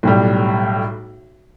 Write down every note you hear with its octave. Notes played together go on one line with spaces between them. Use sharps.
B1 A2 G3